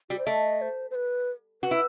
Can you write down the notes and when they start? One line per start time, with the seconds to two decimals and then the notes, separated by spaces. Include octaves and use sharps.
0.10 G3 F#4
0.19 C5
0.27 A3 D#5
0.61 C5
0.91 C5
0.95 B4
1.62 F#4 B4
1.71 E4